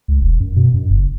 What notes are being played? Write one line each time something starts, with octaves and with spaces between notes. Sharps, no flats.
C#2
E1
F#2
B2
F#2
F#1